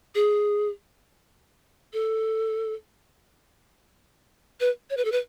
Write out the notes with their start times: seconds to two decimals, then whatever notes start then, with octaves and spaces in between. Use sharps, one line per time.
0.15 G#4
1.93 A4
4.60 B4
4.90 C#5
4.97 B4
5.05 A4
5.12 B4